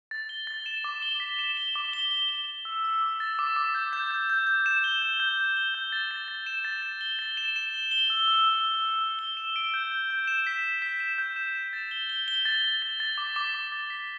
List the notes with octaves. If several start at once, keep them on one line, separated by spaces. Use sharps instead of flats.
A6
G7
A6
E7
D6
G7
B6
E7
G7
D6
G7
G7
G7
G7
E6
E6
D6
A6
D6
D6
G6
G6
G6
G6
G6
E7
G7
G6
G6
G7
G7
G6
A6
A6
A6
E7
A6
E7
G7
A6
E7
E7
G7
G7
E6
E6
E6
E6
E6
E6
G7
E7
D7
G6
G6
G6
E7
B6
B6
B6
E7
G6
E7
E7
A6
G7
G7
G7
A6
A6
A6
A6
D6
D6
D6
A6
B6